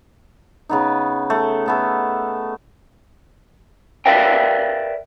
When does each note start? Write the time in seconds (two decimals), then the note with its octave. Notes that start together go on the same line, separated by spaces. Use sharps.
0.69 C#3 B3 D#4
1.30 A3
1.66 A3 B3 A4
4.06 A#4 B4 D5 E5 F5 G5